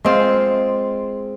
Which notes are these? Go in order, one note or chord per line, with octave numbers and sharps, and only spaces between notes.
G#3 C4 F4